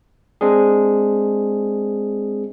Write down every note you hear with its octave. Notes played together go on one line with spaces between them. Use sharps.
G#3 C4 D4 G#4